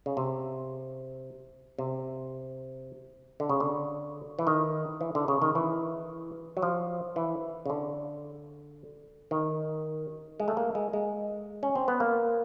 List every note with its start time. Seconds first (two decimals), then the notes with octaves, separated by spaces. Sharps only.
0.06 C#3
0.17 C3
1.79 C3
3.40 D3
3.50 C#3
3.60 D3
4.39 E3
4.47 D#3
5.01 E3
5.15 D3
5.28 C#3
5.42 D#3
5.55 E3
6.57 F#3
6.62 F3
7.16 E3
7.66 C#3
7.70 D3
9.31 D#3
10.40 G#3
10.48 A3
10.57 A#3
10.75 G#3
10.93 G#3
11.63 C#4
11.75 C4
11.88 B3
12.00 A#3